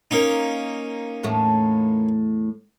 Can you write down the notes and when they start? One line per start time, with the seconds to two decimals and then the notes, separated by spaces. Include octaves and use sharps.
0.11 A#3 C#4 D#4
1.23 E2 A2 A3